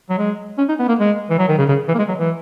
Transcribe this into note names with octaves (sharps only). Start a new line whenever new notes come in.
F#3
G#3
C#4
D#4
B3
A#3
G#3
E3
F#3
D#3
C#3
C#3
E3
A#3
G#3
F#3
E3